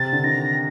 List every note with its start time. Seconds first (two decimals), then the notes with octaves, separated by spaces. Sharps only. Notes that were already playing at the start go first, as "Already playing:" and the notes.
Already playing: C3 A6
0.13 D3
0.24 D#3 A#6